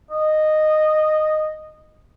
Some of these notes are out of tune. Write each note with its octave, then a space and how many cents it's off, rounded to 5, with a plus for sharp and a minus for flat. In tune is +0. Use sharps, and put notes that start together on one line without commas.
D#5 -10